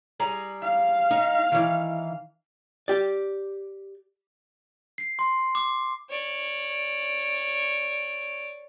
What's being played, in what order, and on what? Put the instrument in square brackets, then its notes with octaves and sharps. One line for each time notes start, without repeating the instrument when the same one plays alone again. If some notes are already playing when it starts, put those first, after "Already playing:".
[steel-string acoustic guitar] G3 G#4 A#5
[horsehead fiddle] F5
[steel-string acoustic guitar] D#4
D#3 E3
[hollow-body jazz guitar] G4 D5
[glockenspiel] C7
C6
D6
[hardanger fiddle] C#5 D5